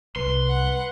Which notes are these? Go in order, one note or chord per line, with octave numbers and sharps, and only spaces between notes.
C2 B4 C6
F#5